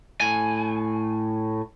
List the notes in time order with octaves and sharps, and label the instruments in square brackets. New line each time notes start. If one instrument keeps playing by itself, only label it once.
[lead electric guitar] A2 G#5